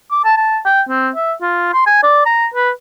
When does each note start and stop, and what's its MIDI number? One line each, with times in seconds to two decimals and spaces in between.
0.11 0.23 86
0.24 0.36 81
0.37 0.59 81
0.65 0.81 79
0.89 1.10 60
1.15 1.32 76
1.42 1.71 65
1.73 1.84 84
1.86 2.03 80
2.03 2.22 74
2.26 2.46 82
2.54 2.70 71